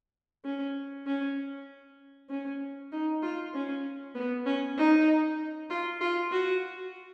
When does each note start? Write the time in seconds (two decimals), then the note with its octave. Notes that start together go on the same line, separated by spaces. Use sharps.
0.44 C#4
1.06 C#4
2.30 C#4
2.92 D#4
3.22 F4
3.54 C#4
4.15 B3
4.46 C#4
4.77 D#4
5.70 F4
6.00 F4
6.31 F#4